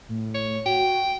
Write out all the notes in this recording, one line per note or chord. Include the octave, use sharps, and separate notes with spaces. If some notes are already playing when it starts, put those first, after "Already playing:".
A2
C#5
F#4 G5